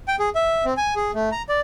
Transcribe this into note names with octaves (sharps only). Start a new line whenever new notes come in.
G5
G#4
E5
C4
G#5
G#4
A3
A#5
D5